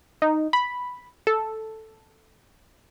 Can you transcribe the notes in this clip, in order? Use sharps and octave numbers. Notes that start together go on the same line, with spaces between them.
D#4
B5
A4